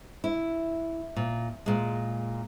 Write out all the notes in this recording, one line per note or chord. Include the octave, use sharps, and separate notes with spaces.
E4
A#2
A#2 G#3